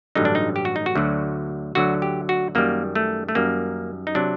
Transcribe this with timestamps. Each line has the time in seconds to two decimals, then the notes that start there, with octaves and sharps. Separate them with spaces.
0.15 A1 G2 D3 F#3 D#4
0.25 D4
0.35 D#4
0.56 G4
0.65 F#4
0.76 D#4
0.86 F#4
0.95 D2 D3 F#3
1.75 D2 D3 F#3 F#4
2.02 G4
2.29 F#4
2.55 F#2 D#3 G3 A#3
2.95 A3
3.29 A3
3.35 F#2 D#3 G3 A#3
4.07 D#4
4.15 C3 F#3 D4